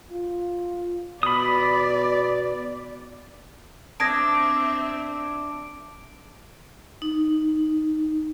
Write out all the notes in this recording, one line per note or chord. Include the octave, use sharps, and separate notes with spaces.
F4
B2 D5 B5 D#6
C4 D4 E5 D#6 G#6 A#6 D7
D#4